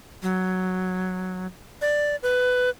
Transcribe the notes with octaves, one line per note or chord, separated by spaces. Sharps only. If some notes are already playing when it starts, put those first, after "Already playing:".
F#3
D5
B4